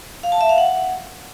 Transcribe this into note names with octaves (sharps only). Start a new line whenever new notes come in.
F5
A5
E5
F5
F#5